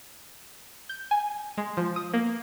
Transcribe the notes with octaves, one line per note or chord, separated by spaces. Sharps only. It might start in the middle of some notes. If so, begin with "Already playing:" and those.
G6
G#5
G#3
F3
D#6
A#3